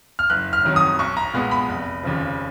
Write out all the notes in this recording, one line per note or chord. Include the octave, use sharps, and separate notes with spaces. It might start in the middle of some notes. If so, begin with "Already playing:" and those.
F6
F#1 F#6
F6
F2 D#3 F#3
D#6
B1 C#6
A#5
A#2 G#3 B3
B5
F1
D#2 C#3 F3